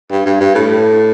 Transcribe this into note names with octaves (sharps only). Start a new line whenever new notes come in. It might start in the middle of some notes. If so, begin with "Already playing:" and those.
G2
G2
G2
A2